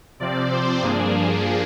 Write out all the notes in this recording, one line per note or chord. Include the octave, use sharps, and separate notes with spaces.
C3 F3 C4 D5
C5
G2 F3 A#3 D4 G#4
G#4